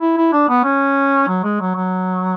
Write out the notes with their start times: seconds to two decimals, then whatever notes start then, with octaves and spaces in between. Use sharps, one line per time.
0.01 E4
0.17 E4
0.33 D4
0.49 B3
0.64 C#4
1.28 F#3
1.44 G#3
1.60 F#3
1.76 F#3